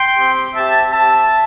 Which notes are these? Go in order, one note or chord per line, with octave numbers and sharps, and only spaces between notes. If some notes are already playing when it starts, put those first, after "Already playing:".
Already playing: G5 C6
C4 G4
C4 G4 E5 A5
C4 G4 E5 A5